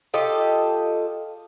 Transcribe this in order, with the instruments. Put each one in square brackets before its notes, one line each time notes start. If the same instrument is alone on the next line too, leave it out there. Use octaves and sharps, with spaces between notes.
[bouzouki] F4 G4 A4 D#5